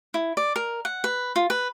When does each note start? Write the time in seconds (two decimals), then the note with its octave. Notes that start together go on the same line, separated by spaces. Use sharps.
0.14 E4
0.37 D5
0.56 A#4
0.85 F#5
1.04 B4
1.36 F4
1.50 B4